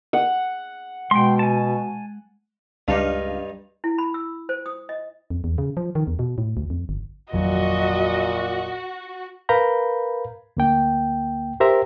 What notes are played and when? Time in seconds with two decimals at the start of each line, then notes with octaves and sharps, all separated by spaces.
0.13 F#5
1.11 B2 G#3 G5 C6
1.39 G#5 A5
2.88 C#2 G2 D4 D#4 F5
3.84 E4
3.98 B5
4.14 E6
4.49 C5
4.66 D#6
4.89 D#5
5.30 F2
5.44 E2
5.58 C#3
5.77 F3
5.95 D#3
6.07 E2
6.19 B2
6.38 A2
6.57 D2
6.70 F2
6.89 G1
7.34 G#1 F2 A#2 F#3 F#4 D#5
9.49 A#4 B4 F5 A#5 B5 G6
10.57 D2 A#3 G5
11.60 G4 A#4 C5 E5 A#5